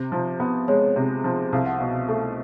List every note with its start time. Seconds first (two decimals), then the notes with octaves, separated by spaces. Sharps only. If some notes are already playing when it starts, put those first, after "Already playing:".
Already playing: C3
0.12 F3
0.40 B3
0.68 G#3 C#5
0.96 C3
1.24 F3
1.52 C2 F5
1.66 F#5
1.78 B2 F5
2.08 A3